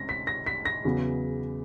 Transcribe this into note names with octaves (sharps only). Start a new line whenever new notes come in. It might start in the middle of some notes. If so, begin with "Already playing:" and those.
Already playing: C#2 C3 A#6
B6
A#6
B6
A#6
E2 C#3 F#3 B3